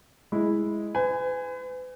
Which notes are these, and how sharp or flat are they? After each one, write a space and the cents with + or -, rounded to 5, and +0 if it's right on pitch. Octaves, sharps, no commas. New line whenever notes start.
G#3 +0 E4 +0
B4 +40 G#5 -10